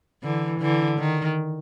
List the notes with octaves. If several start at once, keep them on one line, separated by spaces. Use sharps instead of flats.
D3 E3
D3 E3
D#3